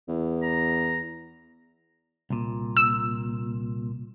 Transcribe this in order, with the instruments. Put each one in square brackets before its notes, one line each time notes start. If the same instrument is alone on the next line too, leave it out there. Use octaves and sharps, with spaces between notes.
[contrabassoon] E2
[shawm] A#5
[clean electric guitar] C2 A#2
[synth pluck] E6